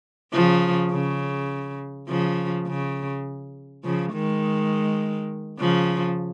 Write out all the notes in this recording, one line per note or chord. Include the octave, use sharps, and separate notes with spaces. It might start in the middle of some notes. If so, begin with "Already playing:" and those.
C#3 F3
C#3
C#3 F3
C#3
C#3 F3
D#3 G#3
C#3 F3